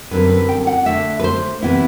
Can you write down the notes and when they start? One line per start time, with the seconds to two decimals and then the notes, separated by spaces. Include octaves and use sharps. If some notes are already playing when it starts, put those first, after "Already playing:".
0.11 F#2 D3 G3 C4 E4 B4
0.30 B4
0.48 G5
0.67 F#5
0.86 D3 A3 D4 E5
1.19 B4
1.24 C5
1.62 C3 E3 B3 E4